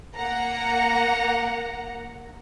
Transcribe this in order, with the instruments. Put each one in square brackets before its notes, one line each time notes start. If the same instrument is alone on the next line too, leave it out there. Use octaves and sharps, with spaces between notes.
[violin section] A#3 F#5 A#5